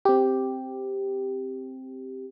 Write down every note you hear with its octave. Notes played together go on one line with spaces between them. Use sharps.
C4 G4